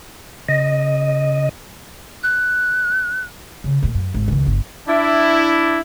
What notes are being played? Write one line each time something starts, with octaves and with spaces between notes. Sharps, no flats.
C#3 D#5
F#6
C#3
D#2 A#2
F#2
G#1
C#2 D#3
G1
D4 E4